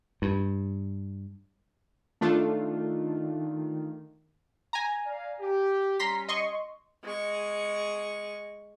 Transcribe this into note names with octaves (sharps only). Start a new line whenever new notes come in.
G2
D#3 A3 D4 F4
G#5 A#5
D5 F5
G4
G3 C#4 A#5 C6 B6
D#5 C6 C#6
G#3 C#6